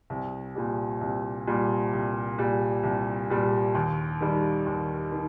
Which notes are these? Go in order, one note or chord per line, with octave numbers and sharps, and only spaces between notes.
C2
A#2 G3
C2
A#2 G3
C2
A#2 G3
C2
A#2 G3
D#2
D#3 G3
D#2
D#3